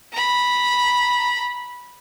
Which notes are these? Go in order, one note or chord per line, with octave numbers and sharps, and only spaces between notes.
A#5 B5